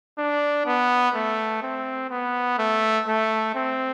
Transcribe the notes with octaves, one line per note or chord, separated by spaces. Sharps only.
D4
B3
A3
C4
B3
A3
A3
C4